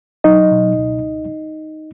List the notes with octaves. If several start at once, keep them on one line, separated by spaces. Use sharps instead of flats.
F#3 D#4 D#5
B2
C#2